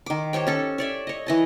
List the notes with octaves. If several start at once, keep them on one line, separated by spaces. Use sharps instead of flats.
D#3 D6
G4 C5 C#5 G5
C#4 A4 C#6
C#5 D5 E5
C#5 D#5
E3 D#5 A5